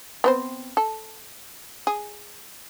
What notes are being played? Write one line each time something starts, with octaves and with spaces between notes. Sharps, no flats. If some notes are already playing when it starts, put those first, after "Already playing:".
B3 C4 C5
A4
G#4